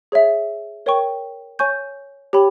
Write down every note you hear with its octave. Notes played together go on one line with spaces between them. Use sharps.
G#4 C#5 E5
A#4 C#5 G5 C#6
C#5 G#5 C#6 G6
G4 C#5 G5 B5